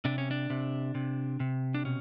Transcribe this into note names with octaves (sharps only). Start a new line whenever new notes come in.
C3 D4
C#4
D4
C3
C3
C3
D4
B2 C#4